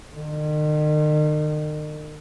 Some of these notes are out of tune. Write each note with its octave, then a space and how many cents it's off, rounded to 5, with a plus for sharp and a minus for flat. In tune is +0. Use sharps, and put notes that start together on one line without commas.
D#3 -40